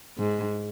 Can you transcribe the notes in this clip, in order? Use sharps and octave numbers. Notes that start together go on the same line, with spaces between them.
G#2